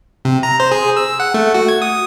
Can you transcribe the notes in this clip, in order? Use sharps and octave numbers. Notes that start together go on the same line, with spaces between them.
C3
A#5
C5
G#4
E6
F#5
A3
F#4
G#6
D#6